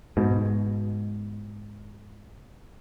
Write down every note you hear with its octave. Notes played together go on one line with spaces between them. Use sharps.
G#2 B2